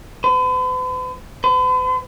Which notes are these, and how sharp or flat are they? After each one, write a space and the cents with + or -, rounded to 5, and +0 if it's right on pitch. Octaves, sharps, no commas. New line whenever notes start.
B4 +45
B4 +45